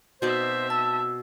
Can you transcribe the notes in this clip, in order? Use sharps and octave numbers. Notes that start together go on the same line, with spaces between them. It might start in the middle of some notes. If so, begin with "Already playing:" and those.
B2 C4 D#4 C5 D5 E5
A5 E6